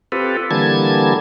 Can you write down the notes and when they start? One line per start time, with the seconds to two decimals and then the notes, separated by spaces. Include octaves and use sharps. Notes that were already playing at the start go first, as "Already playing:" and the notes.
0.12 C4 F4 G4 A4 B4
0.51 D3 E3 G3 A#3 A5 G#6